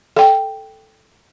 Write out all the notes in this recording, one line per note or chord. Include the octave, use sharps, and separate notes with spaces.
A4 G5